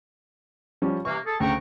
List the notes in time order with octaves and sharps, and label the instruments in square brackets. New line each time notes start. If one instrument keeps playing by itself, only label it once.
[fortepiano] F3 G3 C#4
[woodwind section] C3 E3 A#3 [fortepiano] C#6
[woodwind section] G#4 A4 A5
[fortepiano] D2 C#3 [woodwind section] G5 A#5 C#6